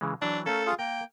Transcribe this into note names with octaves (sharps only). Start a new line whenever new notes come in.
C#3 E3 G#3
E3 F#3 D4
A3 C#4 A4 A#4 F5
F4 G#4 F5
A#3 A#4 G5